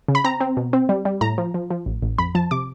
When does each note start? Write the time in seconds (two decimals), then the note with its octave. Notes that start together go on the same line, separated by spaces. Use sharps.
0.08 C#3
0.15 B5
0.24 C4 A#5
0.40 C4
0.57 B2
0.73 C4
0.89 G3
1.05 G3
1.21 A2 A#5
1.38 F3
1.54 F3
1.70 F3
1.86 A1
2.03 A1
2.18 F2 B5
2.35 F3 A5
2.51 C3 D6